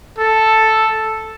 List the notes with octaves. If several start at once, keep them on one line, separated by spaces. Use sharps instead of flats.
A4